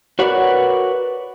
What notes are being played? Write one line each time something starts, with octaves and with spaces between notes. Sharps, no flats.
F#4 A#4 B4 C#5 D5 F#5